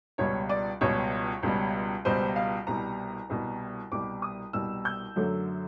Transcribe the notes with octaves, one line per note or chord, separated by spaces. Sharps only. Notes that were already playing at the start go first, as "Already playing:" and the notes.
C#2 B2 G3 C#5
D5
C#2 B2 G3 C#5
C#2 B2 G3
C#2 B2 G3 C5
F5
C2 B2 G3 A#5
C2 B2 G3
C2 B2 G3 D6
D#6
C2 B2 G3 E6
G6
F#2 D3 F#3 A3